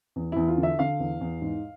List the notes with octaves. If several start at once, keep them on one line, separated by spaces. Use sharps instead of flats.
E2
E2 E4
F4
D3
E5
D3 F5
E2
E2
G#2